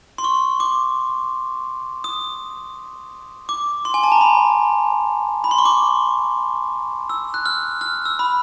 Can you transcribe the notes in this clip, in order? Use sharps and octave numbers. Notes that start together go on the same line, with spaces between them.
C6
C#6
D6
D#6
D6
C6
G#5
A5
A#5
B5
B5
C6
C#6
D6
E6
F#6
F6
F6
E6
B5